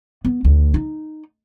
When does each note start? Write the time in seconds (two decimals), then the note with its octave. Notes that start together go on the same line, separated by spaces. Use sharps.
0.25 B3
0.45 D2
0.74 D#4